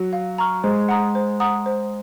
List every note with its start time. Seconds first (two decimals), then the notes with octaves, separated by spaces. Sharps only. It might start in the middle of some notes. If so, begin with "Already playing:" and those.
Already playing: F#3
0.13 F5
0.38 A#5 C#6 F6
0.64 G#3 C5
0.88 F#5 A#5 D#6
1.15 C5
1.40 F#5 A#5 D#6
1.66 C5